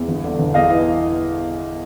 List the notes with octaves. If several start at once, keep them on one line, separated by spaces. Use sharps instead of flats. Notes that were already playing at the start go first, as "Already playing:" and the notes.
Already playing: E2
G1
D3
G1
E2 D#5 F5
E3